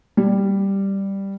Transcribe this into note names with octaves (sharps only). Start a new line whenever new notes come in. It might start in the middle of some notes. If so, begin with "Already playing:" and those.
G3